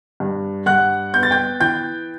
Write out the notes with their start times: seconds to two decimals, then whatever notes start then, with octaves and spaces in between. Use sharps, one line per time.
0.20 G2
0.66 G2 F#5 F#6
1.13 B3 G6
1.23 A6
1.31 G5 G6
1.60 E3 G5 G6